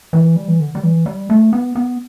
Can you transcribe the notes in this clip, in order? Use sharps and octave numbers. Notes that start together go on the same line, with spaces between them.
E3
G3
E3
D3
G3
E3
G3
A3
B3
B3